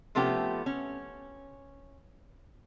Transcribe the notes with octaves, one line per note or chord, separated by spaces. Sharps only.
C3 F3 A3 B3 C#4 G4
C#4